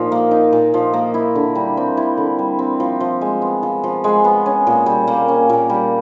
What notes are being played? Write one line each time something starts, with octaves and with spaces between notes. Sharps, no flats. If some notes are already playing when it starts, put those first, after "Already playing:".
Already playing: A#2 F3 D#4
A#3
D#4
A#2
F3
A#3
E4
D3
G3
C4
E4
D3
G3
C4
F3
F3
G#3
B3
F3
F3
G#3
B3
C#4
A#2
G3
A#3
C#4
A#2
G3